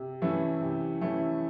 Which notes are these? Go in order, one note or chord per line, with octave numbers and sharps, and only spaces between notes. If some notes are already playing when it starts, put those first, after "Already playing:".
Already playing: C3
E3 A3 C#4 E4
C3
E3 A3 C#4 E4